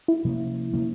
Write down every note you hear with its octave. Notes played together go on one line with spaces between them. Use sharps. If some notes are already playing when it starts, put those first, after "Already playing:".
E4
C3 F3 A#3 C#4
C3 F3 A#3 C#4